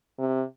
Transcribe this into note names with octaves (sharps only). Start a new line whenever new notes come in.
C3